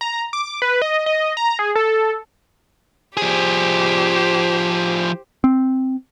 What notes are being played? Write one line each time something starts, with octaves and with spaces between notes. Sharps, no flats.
A#5
D6
B4
D#5
D#5
A#5
G#4
A4
F3 G4 G#4 C5
C4